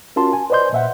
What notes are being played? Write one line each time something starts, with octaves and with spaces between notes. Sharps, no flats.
C#4 F4 F#4 A#4 A5 C6
G#5
B4 C5 D5 D#5 C6 G6
A#2 E5 F#5